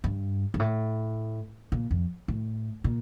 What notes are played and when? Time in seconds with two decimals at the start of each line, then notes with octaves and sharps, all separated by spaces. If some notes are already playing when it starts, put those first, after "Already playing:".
0.04 G2
0.54 G2
0.60 A2
1.72 A#2
1.91 F2
2.28 A2
2.84 A#2